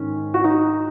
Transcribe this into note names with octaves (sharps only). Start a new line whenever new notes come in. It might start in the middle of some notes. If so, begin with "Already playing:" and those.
Already playing: G#2 D#3 C#4
F#4
D#4